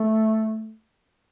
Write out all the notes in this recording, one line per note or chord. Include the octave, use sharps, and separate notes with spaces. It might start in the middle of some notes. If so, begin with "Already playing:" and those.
Already playing: A3